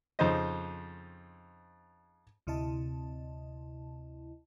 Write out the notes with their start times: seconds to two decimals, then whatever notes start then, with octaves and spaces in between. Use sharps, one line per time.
0.19 F2 C#3 D#4 C5 D#5
2.47 D2 C3 E4 D#5 A5